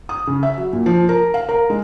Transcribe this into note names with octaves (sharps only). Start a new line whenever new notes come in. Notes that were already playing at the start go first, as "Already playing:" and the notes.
D#6
C#3
E5
F#3
A#2
F3
A#4
F5
A#4
G#3